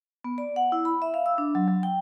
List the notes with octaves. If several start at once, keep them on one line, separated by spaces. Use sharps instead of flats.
B3
D5
F#5
E4
B5
E5
F5
E6
D4
F#3
F#3
G5